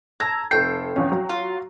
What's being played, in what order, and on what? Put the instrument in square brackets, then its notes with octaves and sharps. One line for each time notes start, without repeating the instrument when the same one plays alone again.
[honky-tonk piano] A5 E6 G#6 [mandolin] A#5
[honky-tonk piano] F1 A4 C7 [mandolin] G5
[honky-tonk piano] G1 E2 C#4
F#3
[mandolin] F4